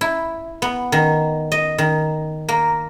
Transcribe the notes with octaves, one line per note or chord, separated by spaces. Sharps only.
E4
B3
D#3
D#5
D#3
A#3